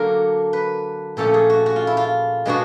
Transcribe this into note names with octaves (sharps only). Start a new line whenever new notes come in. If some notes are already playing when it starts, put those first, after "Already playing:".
Already playing: D3 F#3 A#3 D4 A#4
B4
A#2 F3 A3 C#4 A4
G#4
F#4
F#4
F4
E4
F4
B2 G#3 B3 D4 F#4